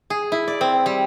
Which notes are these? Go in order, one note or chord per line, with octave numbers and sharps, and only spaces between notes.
G#4
E4
D5
C4
G3